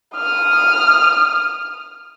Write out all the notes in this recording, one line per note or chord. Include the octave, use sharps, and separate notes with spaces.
D#6 F6